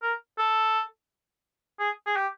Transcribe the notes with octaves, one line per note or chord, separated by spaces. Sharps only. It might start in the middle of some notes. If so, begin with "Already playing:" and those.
A#4
A4
G#4
G#4
G4